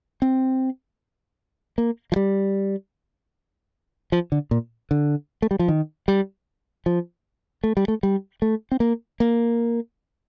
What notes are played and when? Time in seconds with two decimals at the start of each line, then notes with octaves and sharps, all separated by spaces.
0.22 C4
1.78 A#3
2.12 F3
2.16 G3
4.12 F3
4.32 D3
4.51 A#2
4.91 D3
5.42 A3
5.51 G3
5.59 F3
5.68 D#3
6.08 G3
6.86 F3
7.64 A3
7.77 G3
7.88 A3
8.03 G3
8.42 A3
8.72 C4
8.80 A#3
9.20 A#3